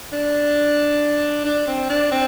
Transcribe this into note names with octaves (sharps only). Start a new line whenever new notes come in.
D4
D4
C4
D4
C4